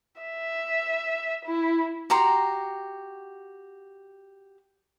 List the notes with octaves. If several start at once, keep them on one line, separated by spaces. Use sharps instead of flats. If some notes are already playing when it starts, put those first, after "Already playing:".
E5
E4
F#4 G4 A#5 C6